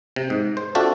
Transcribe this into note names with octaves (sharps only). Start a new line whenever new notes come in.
C3
G#2
C5
C4 D4 F4 F#4 A4 E5